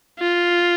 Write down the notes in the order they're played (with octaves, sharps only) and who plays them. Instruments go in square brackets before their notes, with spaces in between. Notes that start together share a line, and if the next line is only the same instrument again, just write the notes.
[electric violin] F4